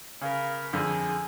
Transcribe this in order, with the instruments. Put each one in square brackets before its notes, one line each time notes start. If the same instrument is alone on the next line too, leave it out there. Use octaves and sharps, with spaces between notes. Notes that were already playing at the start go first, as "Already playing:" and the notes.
[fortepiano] C#3 [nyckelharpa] A#4 B5
[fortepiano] F2 D3 [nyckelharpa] G#4